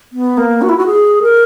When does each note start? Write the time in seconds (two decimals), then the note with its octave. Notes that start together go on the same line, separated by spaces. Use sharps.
0.13 B3
0.37 A#3
0.62 F#4
0.69 E4
0.78 F#4
0.87 G#4
1.22 A#4